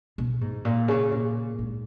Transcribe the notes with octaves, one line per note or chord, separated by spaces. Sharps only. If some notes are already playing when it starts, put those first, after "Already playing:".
B2
G#2
A#2
C#3
A#2
G#2